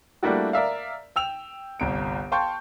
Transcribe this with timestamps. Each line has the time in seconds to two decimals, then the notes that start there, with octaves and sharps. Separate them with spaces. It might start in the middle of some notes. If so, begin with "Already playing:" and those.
0.23 G3 A3 A#3 D4 E4 F#4
0.53 A#4 D5 E5 F5
1.16 G5 E6 F7
1.80 G1 C2 D7
2.32 F5 G5 A5 C6 C#6 G6